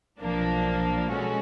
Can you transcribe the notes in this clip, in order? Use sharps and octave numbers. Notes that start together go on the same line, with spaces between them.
B1 A#2 F3 A#3 D4
B2 G#3 C#4 F#4 A4